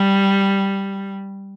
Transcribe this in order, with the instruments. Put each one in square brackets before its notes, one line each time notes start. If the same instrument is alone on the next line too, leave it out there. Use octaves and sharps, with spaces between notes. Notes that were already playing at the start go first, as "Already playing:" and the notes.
Already playing: [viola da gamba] G3